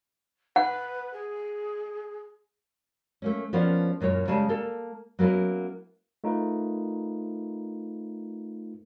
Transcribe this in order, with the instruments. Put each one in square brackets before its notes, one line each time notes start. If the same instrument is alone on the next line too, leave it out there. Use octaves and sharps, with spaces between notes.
[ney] B4 [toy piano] F#5
[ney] G#4
[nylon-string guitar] A3 A#3 C#4
F3 A#3 B3 C#4 D4
F#2 A#2 A#3 C#5
C#3 G3 G#3 G#4 A5
A#3 A4
F#3 A#3 B3 C#4 E4
[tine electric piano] A3 D#4 F4 A#4 B4